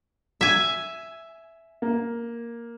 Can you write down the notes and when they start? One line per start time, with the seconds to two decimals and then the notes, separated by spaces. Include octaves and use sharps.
0.41 E5 G#5
1.82 A#3